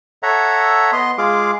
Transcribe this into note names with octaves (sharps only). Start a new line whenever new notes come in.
A4 C#5 E5 F#5 A#5
B3 D#5 C6
G#3 F4 G#4 F5 D6